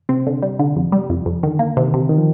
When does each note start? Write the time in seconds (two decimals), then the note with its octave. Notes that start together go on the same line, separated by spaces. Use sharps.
0.09 C3 C4
0.27 D3
0.43 G3
0.59 D3
0.76 F2
0.92 G3
1.10 F2
1.26 F2
1.43 D3 D#3
1.59 A#3
1.77 C3 D#3
1.94 C3
2.10 D#3
2.18 F3